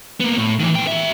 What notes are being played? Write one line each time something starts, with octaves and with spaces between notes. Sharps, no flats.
A#3 B3
A2
D#3 E3
B3 G5
F#4 E5